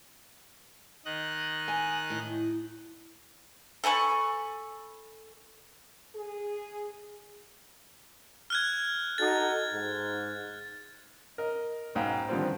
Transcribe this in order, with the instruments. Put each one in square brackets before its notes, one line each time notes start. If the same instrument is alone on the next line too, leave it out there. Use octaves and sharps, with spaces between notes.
[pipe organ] D#3 D#5 F#6
[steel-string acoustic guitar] G#5
A2
[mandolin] A4 G#5 B5 C#6
[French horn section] G#4
[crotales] F6 F#6 G#6
[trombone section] D#4 F#4 A4 [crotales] A6
[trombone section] G#2
[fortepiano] A#4 D#5
B1 G#2 F5 G5
D3 D#3 F3 G3 B3 C4